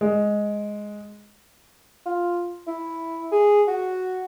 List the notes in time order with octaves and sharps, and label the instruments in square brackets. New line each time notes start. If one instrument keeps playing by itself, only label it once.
[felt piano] G#3
[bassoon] F4
E4
G#4
F#4